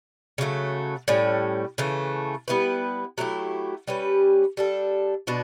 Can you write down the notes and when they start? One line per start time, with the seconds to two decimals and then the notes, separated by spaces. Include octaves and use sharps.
0.38 C#3 F#3 A3
1.08 A2 G3 C#4
1.78 C#3 E3 A3
2.48 G3 B3 E4 B4
3.18 F#3 A3 E4 G4
3.87 G3 C#4 G4 B4
4.57 G3 D4 A4
5.27 B2 D4 F#4